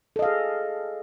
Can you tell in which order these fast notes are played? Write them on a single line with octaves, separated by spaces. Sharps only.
A4 D#5 F5 G#4